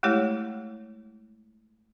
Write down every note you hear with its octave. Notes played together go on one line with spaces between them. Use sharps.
G#3 A3 E4 G4 C#5